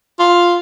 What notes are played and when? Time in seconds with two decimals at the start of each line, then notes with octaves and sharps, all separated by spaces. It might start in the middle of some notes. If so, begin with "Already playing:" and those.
0.19 F4